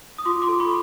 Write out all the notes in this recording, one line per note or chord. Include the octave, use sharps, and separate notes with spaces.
D#6
F4 C6 D6
C6 D6
A4
B5 C#6